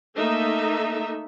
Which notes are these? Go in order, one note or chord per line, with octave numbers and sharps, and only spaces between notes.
A3 A#3 D#4 A4 E5